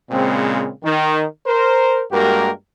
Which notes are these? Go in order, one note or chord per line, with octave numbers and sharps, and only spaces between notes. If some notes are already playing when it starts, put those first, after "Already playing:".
A#2 C#3 G#3 C4
D#3
A#4 C5
G2 G#3 A#3 F#4 G4 A#4